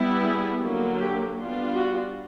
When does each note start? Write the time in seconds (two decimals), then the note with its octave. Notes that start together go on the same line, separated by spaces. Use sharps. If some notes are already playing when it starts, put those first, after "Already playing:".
Already playing: G3 B3 E4
0.24 G#4
0.61 D3 F#3 A#3
1.00 G4
1.38 G3 B3 D4 F4
1.75 F#4